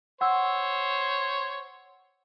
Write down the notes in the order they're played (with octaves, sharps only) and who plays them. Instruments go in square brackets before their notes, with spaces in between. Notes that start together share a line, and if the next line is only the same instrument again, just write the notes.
[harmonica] C5 C#5 [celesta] F#5 E6